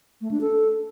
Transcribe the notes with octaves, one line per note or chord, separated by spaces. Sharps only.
A3
D4
A4